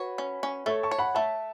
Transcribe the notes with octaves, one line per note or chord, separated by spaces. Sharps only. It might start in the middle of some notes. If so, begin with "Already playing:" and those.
Already playing: F#4 B4 C#5
C#4
C#4
A3 A4 C#5
A5 C#6
C#5
F#5 B5
A3 E5 A5